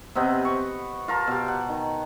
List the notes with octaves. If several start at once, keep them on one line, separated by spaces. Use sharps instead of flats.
C3 B3 C4 D#5
C#6
F4 A#4 A5
B2 G4
F#5
D#3